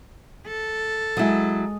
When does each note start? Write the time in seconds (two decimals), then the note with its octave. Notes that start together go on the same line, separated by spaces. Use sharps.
0.46 A4
1.17 F#3 G#3 E4 D#6